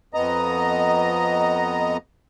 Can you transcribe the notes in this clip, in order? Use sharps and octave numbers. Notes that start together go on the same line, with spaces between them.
F2 B3 D#5 A#5